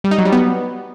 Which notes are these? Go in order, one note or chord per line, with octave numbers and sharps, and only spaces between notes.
G3
D#4
F#3
G3
B3